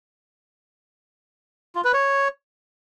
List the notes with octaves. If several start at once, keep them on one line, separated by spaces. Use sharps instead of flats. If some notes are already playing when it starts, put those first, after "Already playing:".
F4
B4
C#5